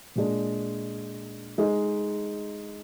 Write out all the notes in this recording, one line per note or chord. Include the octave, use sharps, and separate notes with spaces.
A#2 G#3 D4
G#3 D#4 G#4